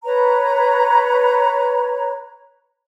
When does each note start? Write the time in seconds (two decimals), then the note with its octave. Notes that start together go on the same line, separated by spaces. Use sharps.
0.05 B4 C#5 A#5